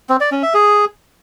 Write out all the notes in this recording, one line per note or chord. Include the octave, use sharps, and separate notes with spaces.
C4
D5
C#4
E5
G#4